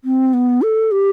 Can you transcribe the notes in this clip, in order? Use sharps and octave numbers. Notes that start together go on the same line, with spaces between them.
C4
B3
A4
G4